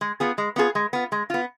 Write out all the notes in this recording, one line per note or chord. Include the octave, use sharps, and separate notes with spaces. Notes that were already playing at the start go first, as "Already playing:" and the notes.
G#3
B3 F4 G#4
G#3
B3 F4 G#4
G#3
B3 F4
G#3
B3 F4